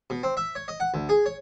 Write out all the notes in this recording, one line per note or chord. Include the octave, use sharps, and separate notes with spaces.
B2
C4
E5
C#5
D#5
F#5
D2
G#4
C#5